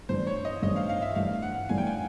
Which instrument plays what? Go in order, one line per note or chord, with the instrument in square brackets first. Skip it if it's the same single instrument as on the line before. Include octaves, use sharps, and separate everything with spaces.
[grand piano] G2 E3 A3 D4 [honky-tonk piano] C5
[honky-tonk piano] C#5
D#5
[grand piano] G2 E3 A3 D4 [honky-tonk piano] D#5
[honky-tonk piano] F5
F5
E5
[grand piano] G2 E3 A3 D4 [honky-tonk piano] F5
[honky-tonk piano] F#5
[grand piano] G2 E3 A3 D4 [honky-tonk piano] G#5
[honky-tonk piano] G5
G#5